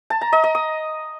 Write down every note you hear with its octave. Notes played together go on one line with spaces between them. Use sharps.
A5
A#5
D#5
D#5
D#6